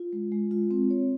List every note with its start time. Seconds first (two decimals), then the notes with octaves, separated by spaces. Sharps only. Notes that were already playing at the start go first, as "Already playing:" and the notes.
Already playing: F4
0.13 G#3
0.32 G#3
0.51 F4
0.71 C4
0.90 C#5